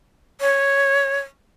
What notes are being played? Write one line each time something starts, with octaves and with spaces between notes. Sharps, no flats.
C#5